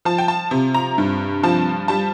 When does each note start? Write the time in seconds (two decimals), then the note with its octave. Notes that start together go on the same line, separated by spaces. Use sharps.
0.05 F3 A5
0.18 G5
0.28 A5
0.51 C3
0.74 A#5
0.98 G2
1.43 F3 A5
1.88 G3 A5